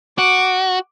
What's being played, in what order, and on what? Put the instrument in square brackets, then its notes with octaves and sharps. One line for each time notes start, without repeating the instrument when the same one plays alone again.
[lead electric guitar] F#4 [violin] D6